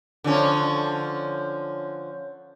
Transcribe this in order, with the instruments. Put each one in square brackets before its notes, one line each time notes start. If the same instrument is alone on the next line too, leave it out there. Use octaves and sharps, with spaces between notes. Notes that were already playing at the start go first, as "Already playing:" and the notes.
[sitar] D3 F3 C#4